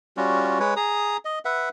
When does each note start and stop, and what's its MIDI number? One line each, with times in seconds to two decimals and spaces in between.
0.17 0.59 55
0.17 0.59 61
0.17 0.59 65
0.17 0.59 66
0.60 0.74 56
0.60 0.74 71
0.60 0.74 73
0.76 1.17 68
0.76 1.17 82
0.76 1.17 87
1.25 1.39 75
1.45 1.69 71
1.45 1.69 76
1.45 1.69 78